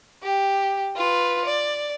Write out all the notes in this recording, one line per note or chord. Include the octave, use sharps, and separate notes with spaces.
G4
F4 B4
D5